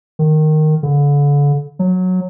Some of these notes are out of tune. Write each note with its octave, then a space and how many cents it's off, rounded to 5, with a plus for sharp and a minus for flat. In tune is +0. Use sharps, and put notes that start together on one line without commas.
D#3 -10
D3 -35
F#3 -10